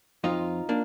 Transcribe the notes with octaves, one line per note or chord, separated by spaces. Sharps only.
F2 D#4 F4
A#3 D4